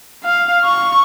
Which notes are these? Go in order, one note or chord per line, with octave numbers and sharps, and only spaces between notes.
F5
C#6